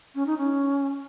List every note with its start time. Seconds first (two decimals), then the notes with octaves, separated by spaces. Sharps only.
0.15 C#4
0.26 D#4
0.38 C#4